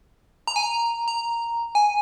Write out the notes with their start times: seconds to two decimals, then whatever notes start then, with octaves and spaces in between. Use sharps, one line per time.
0.47 A#5
0.56 G#5
0.63 A#5
1.08 A#5
1.75 G#5